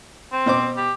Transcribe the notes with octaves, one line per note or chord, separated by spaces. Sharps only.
C4
B2 C5 D6
G4